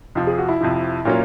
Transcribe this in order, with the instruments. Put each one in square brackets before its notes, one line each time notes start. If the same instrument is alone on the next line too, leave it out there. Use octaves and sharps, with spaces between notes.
[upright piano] F2 C3 F3
[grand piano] G#4
F#4
E4
[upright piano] F2 C3 F3
A#2 F#3 A#3 C#4 F4